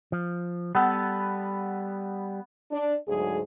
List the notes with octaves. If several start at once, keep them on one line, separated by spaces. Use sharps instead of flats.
F3
G3 B3 A4
D4
D2 G#2 F#3 G#4